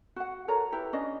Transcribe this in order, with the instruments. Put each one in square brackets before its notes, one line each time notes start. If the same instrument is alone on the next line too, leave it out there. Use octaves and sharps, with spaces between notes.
[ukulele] F#4 F#5
A4 A#4 C#5 A#5
E4 G4 B4
C#4 D4 D#5